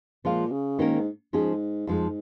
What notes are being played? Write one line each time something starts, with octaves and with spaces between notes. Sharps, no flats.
A#2 F3 G#3 F4
C#3
G#2 D#3 A#3 C#4 A#4
G#2 F3 C#4 G#4
F2 G#2 F3 G#3